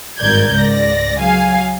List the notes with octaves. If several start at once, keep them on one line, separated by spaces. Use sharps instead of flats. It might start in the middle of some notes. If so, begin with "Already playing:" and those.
G#1 G2 A#4 D5 G6 G#6
C#2 G#2 D5 A#6
F#3 G#4 F5 G#5